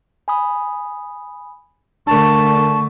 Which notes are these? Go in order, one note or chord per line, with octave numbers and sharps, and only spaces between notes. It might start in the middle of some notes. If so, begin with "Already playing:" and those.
G#5 B5 D#6
D3 A3 D4 A#4 A5 C#6